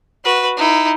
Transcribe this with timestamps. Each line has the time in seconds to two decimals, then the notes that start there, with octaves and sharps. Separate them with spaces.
0.25 F#4 B4
0.57 D#4 E4